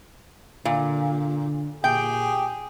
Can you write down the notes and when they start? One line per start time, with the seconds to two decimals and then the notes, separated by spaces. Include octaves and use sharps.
0.65 A#2 D3
1.84 A#2 G4 G#4 G5